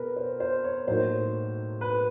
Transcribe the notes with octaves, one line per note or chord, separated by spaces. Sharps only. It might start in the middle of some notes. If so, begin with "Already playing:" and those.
Already playing: B2 G#4 A#4 B4
C5
C5
C#5
A2 F#3 A#3 D#4 C5
B4